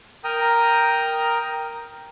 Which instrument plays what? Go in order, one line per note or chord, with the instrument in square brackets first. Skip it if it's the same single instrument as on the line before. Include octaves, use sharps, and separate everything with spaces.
[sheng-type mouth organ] A#4 G5 A#5 D#6